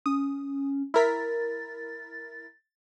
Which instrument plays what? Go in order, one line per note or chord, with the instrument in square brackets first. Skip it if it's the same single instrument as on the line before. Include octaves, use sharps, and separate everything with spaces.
[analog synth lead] C#4 [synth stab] D#6
[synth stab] E4 A#4 B6 [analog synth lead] A6